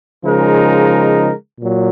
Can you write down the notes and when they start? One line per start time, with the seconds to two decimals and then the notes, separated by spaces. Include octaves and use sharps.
0.25 C#3 F3 G#3 D#4 A#4
1.60 A#2 F#3